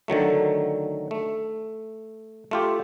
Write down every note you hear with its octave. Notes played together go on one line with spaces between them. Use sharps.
D3 D#3 F#3 A3
A3
A3 F4 G4